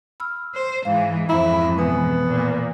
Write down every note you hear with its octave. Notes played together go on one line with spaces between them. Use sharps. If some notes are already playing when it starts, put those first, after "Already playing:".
B5 E6 F6
C5
G#2 E3 F5
F2 G#2 E4 C5 A#5
B2 E3 B3 G#5
A#2